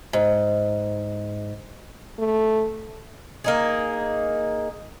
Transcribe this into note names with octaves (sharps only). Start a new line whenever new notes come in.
G#2
A3
A#3 D#4 G#4